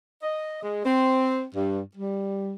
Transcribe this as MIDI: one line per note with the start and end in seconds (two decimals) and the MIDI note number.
0.22 0.60 75
0.61 0.83 56
0.84 1.43 60
1.53 1.79 43
1.95 2.53 55